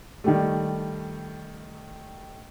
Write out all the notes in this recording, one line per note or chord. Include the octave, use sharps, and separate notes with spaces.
D#3 G3 A3